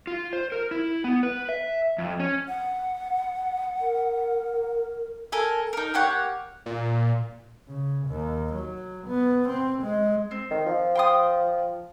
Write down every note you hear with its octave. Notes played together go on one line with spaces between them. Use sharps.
F4
C5
A#4
E4
B3
B4
E5
F2
C#4
F#5
A#4
A4 A#4 G#5
D#4 A#4
A#3 G4 C#5 F#5
A#2
C#3
D#2
F#3
B3
C4
G#3
C4
D#3
F3
G5 C6 D#6